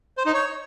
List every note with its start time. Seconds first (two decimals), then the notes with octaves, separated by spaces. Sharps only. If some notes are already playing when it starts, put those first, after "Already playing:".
0.17 C5
0.26 D#4
0.34 C#5